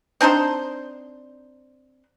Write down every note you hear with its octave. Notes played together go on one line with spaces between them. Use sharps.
C4 D4 D#4 C5